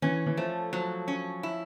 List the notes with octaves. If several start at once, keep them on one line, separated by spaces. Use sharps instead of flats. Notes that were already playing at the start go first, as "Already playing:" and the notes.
E3 C#4
E3
F3 A3
F3 F#3
C#4
E4